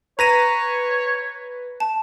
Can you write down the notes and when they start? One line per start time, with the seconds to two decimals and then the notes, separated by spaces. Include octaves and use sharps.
0.19 B4 C#5 A#5 A#6 D#7
1.80 A5